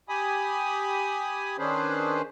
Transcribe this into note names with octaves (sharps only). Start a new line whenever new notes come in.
G4 G#5 B5 D#6
D#3 C#4 D4 G#4 B4 C5